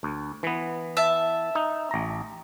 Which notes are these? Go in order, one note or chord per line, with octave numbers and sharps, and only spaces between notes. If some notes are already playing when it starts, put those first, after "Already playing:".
D2
E3 B3
E5 A5
D#4
A1 A#5